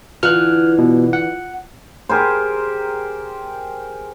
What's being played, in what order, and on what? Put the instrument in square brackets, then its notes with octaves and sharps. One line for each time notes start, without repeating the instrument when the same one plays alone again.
[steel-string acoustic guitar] D3 E3 [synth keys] F4 [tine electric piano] F6 F#6
[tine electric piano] B2
F#5
[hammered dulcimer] G4 G#4 A#4 C5